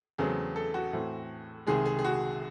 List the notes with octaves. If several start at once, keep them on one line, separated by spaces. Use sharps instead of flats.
E2 C#3 F#3 A3 C4 G#4
A4
F#4
A2 E3 A3 C4
C2 C3 D#3 G#3 G#4
G#4
G#4
F#4